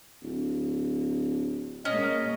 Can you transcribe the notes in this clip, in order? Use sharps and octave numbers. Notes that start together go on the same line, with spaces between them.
D1
B2 G#3 A#3 C#4 D#5